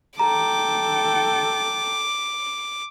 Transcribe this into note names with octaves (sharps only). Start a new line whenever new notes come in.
A4 G5 A#5 D6